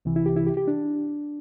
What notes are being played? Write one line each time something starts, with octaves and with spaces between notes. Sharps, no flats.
C2 C3 E3
E4
G4
E4
G4
G4
D4